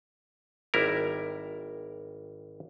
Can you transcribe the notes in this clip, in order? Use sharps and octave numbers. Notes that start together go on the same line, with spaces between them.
G#1 G3 E4 A#4